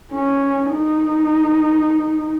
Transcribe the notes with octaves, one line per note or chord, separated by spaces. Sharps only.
C#4
D#4